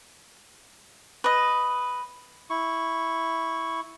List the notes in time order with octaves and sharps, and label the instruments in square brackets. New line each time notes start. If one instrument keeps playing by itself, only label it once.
[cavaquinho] B4 D#5
[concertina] E4 C#6